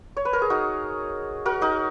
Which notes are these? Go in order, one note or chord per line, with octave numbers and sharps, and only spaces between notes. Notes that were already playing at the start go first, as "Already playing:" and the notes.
C#5
B4
A#4
G#4
D#4 F#4
F#4 A#4
D#4 F#4